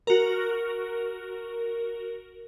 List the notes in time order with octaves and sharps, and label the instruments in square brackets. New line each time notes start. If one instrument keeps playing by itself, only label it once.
[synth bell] F#4 A#4